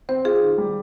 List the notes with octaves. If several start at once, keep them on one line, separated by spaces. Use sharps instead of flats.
C4 C5
F4 G#4
D#3
G3